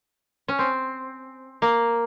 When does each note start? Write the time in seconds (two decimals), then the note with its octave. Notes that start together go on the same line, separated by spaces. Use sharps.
0.48 C#4
0.59 C4
1.62 A#3